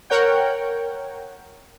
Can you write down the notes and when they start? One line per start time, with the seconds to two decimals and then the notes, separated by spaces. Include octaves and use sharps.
0.10 A#4 C#5 F#5 G5